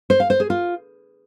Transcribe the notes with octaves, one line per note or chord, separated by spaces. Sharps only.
C5
F5
C5
G#4
F4